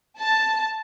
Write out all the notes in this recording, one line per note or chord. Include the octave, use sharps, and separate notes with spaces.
A5